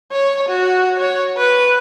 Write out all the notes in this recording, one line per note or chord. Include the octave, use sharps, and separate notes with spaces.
C#5
F#4
C#5
B4